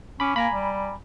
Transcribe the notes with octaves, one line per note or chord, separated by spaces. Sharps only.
C#4 B5 D6
A#3 G#5 A#5 B5
G3